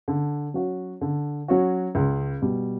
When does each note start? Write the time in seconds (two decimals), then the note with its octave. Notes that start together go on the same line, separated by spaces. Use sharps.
0.08 D3
0.54 F#3 C#4 F#4
1.01 D3
1.48 F#3 C#4 F#4
1.95 C#2
2.42 B2 G3